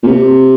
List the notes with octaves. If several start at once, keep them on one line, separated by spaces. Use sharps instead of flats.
A#2
C3